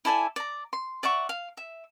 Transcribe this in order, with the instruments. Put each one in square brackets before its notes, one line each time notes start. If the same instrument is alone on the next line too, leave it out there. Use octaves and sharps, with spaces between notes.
[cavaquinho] E4 A4 D5 G#5
D5 A#5
C6
D5 E5 F#5 C#6
F5
E5